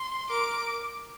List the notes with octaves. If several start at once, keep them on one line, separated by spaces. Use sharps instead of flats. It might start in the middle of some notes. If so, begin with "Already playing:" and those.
Already playing: C6
A#4 D6